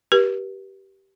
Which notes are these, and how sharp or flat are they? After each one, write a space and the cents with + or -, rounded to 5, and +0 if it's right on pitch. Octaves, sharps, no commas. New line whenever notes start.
G4 -15 B4 -45